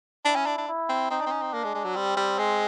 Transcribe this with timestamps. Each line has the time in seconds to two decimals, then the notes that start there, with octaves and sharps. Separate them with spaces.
0.25 D4 E4
0.36 C#4
0.46 D4
0.58 D4
0.68 E4
0.89 C4
1.10 C4 D#4
1.21 D4
1.26 C4
1.31 C#4
1.42 C4
1.53 A#3 D4
1.64 G#3
1.74 G#3
1.84 F#3
1.95 G3 C4
2.17 G3
2.39 G#3